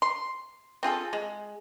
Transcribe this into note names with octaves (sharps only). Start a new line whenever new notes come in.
C6
C4 F4 G#4 A4
G#3